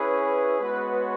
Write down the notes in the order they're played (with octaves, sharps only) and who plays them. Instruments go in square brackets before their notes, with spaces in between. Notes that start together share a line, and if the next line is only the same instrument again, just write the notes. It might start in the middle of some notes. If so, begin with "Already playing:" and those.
Already playing: [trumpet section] C#4 E4 G#4 C#5 [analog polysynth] B4
[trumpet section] G#3 B3 F#4 C#5 [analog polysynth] B4